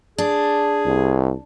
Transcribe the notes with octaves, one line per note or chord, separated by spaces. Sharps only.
D4 G#4
C2